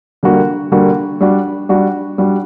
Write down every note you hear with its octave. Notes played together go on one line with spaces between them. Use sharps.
D3 G3 A#3 F#4
D3 G3 A#3 F#4
G3 D4 F#4
G3 D4 F#4
G3 D4 F#4